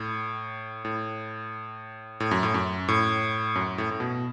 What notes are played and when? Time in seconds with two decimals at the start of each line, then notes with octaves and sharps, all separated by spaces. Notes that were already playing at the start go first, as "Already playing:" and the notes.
Already playing: A2
0.85 A2
2.20 A2
2.31 F#2
2.43 A2
2.54 F#2
2.88 A2
3.55 F#2
3.78 A2
3.91 A2
4.00 B2